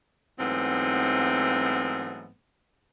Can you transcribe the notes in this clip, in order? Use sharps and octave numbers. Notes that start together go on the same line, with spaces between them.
G#2 E3 F#3 A3 B3 C4